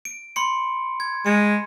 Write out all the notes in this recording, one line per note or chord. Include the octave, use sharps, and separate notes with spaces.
D7
B5 C6 C#7
G#6
G#3 C#7